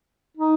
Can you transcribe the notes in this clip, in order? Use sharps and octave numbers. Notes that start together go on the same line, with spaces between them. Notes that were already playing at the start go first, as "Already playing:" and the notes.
D#4